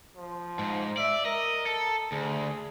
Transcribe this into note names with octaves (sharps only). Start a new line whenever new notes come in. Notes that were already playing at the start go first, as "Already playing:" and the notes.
F3
G#2
D5 E5
A#4 D#5
A4
D2 G#4